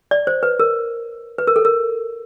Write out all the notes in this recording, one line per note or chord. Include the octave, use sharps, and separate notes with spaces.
D5
C5
B4
A#4
B4
A#4
A4
A#4